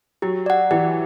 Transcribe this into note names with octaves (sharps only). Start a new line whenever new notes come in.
F#3 G4
D5 F#5
E3 G4